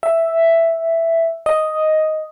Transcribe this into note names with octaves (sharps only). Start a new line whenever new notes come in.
E5
D#5